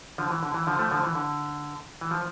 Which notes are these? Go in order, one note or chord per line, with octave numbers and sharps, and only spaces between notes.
D3 F3
E3
D3
E3
D3 F3
F3 A3
D3 F3
E3
D3
E3
F3